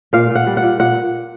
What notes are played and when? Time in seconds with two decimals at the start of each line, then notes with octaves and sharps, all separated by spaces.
0.13 A#2 F5
0.30 A#2
0.35 F#5
0.46 G3
0.57 F#5
0.63 A#2
0.79 A#2 F#5